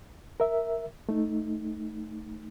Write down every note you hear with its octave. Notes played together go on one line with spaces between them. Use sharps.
A#4 E5
A3 D#4